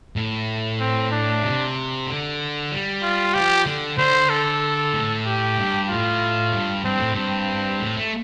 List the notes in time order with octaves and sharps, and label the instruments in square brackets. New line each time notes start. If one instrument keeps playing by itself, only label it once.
[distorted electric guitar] A2
[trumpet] C4
D4
[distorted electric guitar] C3
D3
G3
[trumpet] F4
[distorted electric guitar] F3 [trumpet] G4
[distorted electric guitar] D3
[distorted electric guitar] D3 [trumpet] C5
[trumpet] A4
[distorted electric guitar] A2
[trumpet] G4
[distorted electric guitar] G2
[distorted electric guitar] A2 [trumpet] F4
[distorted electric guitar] G2
[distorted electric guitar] G2 [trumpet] C4
[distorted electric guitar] A2
[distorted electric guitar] G2 [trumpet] C4
[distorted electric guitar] A2
A3